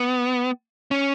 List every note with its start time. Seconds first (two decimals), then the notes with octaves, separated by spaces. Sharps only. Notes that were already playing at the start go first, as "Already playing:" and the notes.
Already playing: B3
0.91 C#4